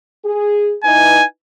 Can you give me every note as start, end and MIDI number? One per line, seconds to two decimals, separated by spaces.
0.25 0.74 68
0.84 1.22 63
0.84 1.22 64
0.84 1.22 71
0.84 1.25 80